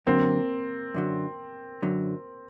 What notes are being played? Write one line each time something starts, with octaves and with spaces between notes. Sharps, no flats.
F#2 D3 F#3 A#3 C4
F#2 D3 F#3
F#2 D3 F#3